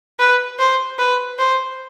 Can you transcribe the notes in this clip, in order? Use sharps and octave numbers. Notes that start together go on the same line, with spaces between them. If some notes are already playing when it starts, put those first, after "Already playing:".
B4
C5
B4
C5